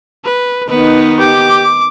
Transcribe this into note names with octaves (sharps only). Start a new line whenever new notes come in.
B4
D#3 B3 D#4 B4
G4 D6